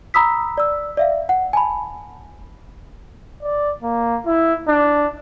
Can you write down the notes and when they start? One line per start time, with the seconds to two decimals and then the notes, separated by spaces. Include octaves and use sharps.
0.14 A#5 B5 D#6 E6 B6
0.58 D5 E6
0.97 D5 E5 F5
1.29 F#5
1.53 G#5 A5 B5
3.43 D5
3.82 A#3
4.26 E4
4.68 D4